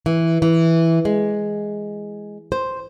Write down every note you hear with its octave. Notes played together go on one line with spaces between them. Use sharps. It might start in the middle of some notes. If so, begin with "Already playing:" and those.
E3
E3
G#3
C5